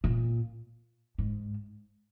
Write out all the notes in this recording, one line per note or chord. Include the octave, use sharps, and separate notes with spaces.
A#2
G#2